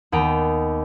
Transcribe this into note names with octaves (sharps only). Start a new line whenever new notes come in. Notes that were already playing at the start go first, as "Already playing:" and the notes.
D#2 B3 G5 A#5